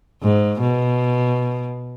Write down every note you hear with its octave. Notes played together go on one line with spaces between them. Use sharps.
G#2
B2